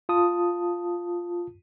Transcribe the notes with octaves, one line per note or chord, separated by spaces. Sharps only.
F4 A5 D#6